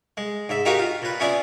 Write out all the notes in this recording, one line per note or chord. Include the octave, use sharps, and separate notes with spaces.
G#3
G#2 E5
D#4 F#4 G4 A#4 F5 G#5
F4
A#2 B4
B3 C#4 E4 G#4 D5